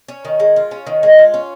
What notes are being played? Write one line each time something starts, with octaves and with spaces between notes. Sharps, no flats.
C#4
D#3
G#3
F4
C#4
D#3
G#3
F4
C#4